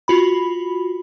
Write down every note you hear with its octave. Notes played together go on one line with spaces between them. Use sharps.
F4 F#4 B5